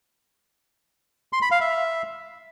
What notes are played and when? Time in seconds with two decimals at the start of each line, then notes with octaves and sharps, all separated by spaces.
1.33 C6
1.42 B5
1.51 F5
1.61 E5